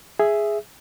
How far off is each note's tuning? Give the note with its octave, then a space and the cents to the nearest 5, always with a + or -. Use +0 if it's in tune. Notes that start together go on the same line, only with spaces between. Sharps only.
G#4 +0 E5 +5